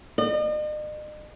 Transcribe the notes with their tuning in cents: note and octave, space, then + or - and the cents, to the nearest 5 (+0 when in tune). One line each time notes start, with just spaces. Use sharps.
D#5 -45